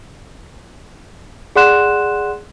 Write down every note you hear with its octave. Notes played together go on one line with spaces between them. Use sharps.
G#4 D5 F#5 C6 F#6 E7